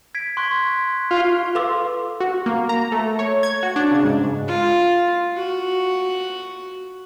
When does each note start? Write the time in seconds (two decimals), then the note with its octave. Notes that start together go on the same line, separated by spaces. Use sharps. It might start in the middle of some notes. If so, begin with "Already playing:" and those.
0.15 G#6 B6 D7
0.37 C6 C#6 F#6
1.11 F4
1.55 A4 B4 F5 C6 D6 E6
2.20 F#4
2.46 A#3
2.69 A#5
2.92 A3
3.19 C#5
3.43 G#6
3.63 F#4
3.76 D4
3.91 C#3
4.05 G#2
4.48 F4
5.37 F#4